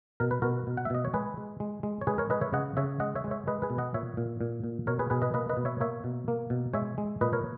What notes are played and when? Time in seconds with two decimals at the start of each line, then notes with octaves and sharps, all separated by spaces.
0.20 B2 A#4
0.31 B4
0.42 B2 F#4 A#4
0.67 B2
0.77 F#5
0.85 E5
0.90 B2 D#5
1.05 C#5
1.14 G#3 G#4 B4
1.37 G#3
1.60 G#3
1.83 G#3
2.01 C#5
2.07 G#3 G#4 B4
2.18 A#4 C#5
2.30 G#3 B4 D#5
2.41 C#5 E5
2.53 C#3 D#5 F#5
2.77 C#3 C#5 E5
3.00 G#3 D#5 F#5
3.16 C#5 E5
3.24 G#3
3.31 C#5 E5
3.47 G#3 B4 D#5
3.62 G#4 B4
3.70 B2
3.78 D#5 F#5
3.94 A#2 C#5 E5
4.17 A#2
4.41 A#2
4.64 A#2
4.87 B2 A#4 C#5
4.99 G#4 B4
5.10 B2 G#4 B4
5.22 B4 D#5
5.34 A#3 B4 D#5
5.49 B4 D#5
5.57 B2
5.65 C#5 E5
5.80 A#3 C#5 E5
6.04 B2
6.28 A#3
6.50 B2
6.74 G#3 C#5 E5
6.98 G#3
7.21 A#2 B4 D#5
7.33 A#4 C#5